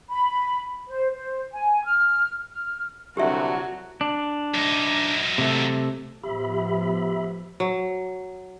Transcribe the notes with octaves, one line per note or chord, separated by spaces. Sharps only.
B5
C5
C5
G#5
F6
F6
C2 D3 F#3 F#4 G4 E5
D4
F#2 D#4
C3 A3
A2 F3 B3 G4 E5 B5
F#3